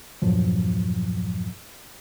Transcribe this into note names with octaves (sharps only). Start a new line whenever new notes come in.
E2 G2 A#2 F3 F#3